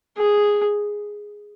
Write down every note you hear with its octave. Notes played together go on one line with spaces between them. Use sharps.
G#4